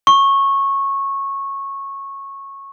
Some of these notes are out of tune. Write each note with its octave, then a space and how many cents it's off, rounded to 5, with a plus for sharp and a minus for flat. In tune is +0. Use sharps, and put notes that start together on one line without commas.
C#6 -15